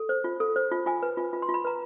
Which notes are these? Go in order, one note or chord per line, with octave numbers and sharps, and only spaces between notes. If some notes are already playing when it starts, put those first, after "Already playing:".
Already playing: A4
C5
F4
A4
C5
F4
F4 G#5
B4
F4
F4
C6
F4
B5
B4 A#5